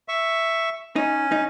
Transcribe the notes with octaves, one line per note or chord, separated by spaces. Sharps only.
E5 C#6
C#4 D#4
D#4